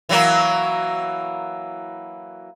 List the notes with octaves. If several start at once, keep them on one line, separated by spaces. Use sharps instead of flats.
E3 F#3 A#3